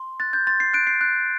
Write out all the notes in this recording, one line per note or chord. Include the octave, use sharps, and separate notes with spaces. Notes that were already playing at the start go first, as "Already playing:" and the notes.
Already playing: C6
F#6 A6
G6
C6 A6
C7
F#6 D7
C7
F#6